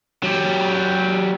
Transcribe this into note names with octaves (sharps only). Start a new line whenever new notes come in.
F#3 G4